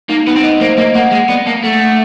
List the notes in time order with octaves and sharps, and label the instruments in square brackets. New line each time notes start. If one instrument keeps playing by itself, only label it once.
[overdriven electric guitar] A#3 [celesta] D#4
[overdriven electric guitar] B3 [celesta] D#4
[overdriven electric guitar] C4
[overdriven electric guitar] B3 [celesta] D#5
[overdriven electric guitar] A#3 [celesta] C5
[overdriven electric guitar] A#3 [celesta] D#5
[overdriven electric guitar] A#3 [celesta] F#5
[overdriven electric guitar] G#3 [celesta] F#5
[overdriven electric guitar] B3 [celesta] D5
[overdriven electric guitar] A#3 [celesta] A5
[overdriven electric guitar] A3 [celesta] F#5
[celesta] F#5